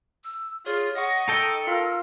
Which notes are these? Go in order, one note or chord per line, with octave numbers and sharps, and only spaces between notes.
E6
F4 G#4 C#5
D#5 F#5 C#6 A#6
D#4 A4 G5 E6
F4 A#4 F5